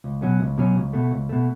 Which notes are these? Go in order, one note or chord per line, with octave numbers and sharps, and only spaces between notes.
C#2
B2 F#3 C#4
C#2
B2 F#3 C#4
C#2
B2 A3
C#2
B2 A3